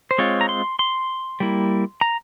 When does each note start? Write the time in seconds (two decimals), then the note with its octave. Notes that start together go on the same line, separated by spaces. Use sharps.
0.11 C5
0.18 G#3 C4 F4 C#5
0.41 A#5
0.49 C6
0.79 C6
1.40 G3 A#3 E4
2.01 A#5